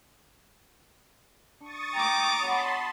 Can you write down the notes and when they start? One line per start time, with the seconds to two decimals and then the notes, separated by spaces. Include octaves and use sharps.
1.61 D4 C#6 D#6 A6
1.95 G#3 G5 A#5 D6
2.43 B3 F#4 C#5 A5 B5 C6